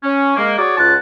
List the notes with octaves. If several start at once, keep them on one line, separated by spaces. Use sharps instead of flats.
C#4
G#3 A#3
F#4 G#4 C#5 D5
C#2 F4 F#5 A5